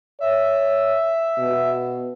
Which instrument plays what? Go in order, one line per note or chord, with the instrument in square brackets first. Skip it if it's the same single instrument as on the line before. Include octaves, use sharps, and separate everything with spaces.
[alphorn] C#5 [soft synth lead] E5
[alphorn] B2